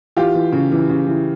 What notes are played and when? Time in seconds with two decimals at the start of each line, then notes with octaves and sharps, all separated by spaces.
0.17 E3 F4 G4
0.35 E3
0.52 C#3
0.72 E3
0.89 C#3
1.07 E3